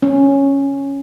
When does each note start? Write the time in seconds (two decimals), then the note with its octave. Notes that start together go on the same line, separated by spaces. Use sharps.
0.02 C#4